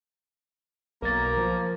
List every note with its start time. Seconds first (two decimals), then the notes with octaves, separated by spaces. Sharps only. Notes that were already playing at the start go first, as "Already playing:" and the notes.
1.02 B1 A#3 A#4 A6
1.37 F3